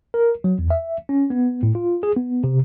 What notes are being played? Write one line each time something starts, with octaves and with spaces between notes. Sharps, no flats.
A#4
F#3
E2
E5
C#4
B3
A2
F4
G#4
B3
C3